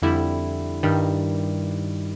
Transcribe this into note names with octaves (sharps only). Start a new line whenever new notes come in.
F2 D3 G3 E4
G2 D#3 G3